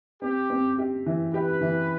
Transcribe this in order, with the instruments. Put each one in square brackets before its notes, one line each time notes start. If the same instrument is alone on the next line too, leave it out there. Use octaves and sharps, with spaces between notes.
[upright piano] C4 [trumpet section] G4
[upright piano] C4
G4
E3
[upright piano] G4 [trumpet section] B4
[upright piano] E3